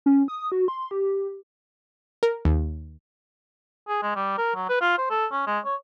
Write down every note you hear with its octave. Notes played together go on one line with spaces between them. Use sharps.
C#4
D#6
F#4
C6
G4
A#4
D#2
G#4
G#3
G3
A#4
F#3
B4
F4
C5
A4
C#4
G#3
C#5